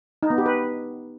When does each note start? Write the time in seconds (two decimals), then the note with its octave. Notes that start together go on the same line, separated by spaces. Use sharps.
0.23 D#4
0.30 B3
0.38 G4
0.46 B4